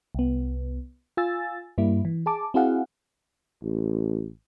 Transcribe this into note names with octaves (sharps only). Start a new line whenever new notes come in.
C2 B3
F4 G#5 E6 A6
G2 G3 A#3 E4
E3
G#4 A5 D6
C4 E4 F#4 G#4 F5 F#5
A1